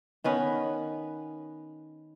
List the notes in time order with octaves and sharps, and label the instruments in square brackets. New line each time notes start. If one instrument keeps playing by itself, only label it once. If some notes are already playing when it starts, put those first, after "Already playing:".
[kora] D#3 B3 C#4 B4